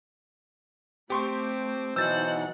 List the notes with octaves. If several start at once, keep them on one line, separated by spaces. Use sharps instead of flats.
A3 C4 G4 C6 C#6
B2 E3 F#3 D#4 C5 F#5 E6 A6